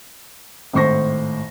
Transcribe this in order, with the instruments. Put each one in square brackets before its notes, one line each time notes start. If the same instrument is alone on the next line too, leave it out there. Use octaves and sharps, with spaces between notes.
[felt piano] G#1 A2 C5 C#6 A#6